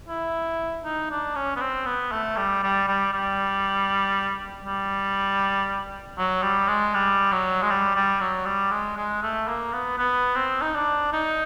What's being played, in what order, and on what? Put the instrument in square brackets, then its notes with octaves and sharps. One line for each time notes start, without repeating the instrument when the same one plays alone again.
[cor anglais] E4
D#4
D4
C#4
B3
C4
B3
A3
G3
G3
G3
G3
G3
F#3
G3
G#3
G3
F#3
G#3
G3
G3
F#3
G3
G#3
G#3
A3
A#3
B3
B3
C4
D#4
D4
D#4